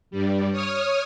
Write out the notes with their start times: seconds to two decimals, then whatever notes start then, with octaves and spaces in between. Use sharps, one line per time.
0.11 G2 G3
0.51 C#5 D#6 F6